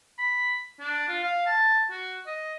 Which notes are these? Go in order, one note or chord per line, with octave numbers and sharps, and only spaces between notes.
B5
D4
F4
F5
A5
F#4
D#5